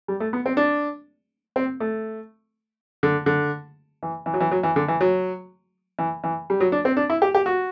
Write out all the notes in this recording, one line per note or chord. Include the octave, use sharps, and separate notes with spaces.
G3
A3
B3
C4
D4
C4
A3
D3
D3
E3
E3
F#3
E3
F#3
E3
D3
E3
F#3
E3
E3
G3
F#3
D4
C4
D4
E4
G4
G4
F#4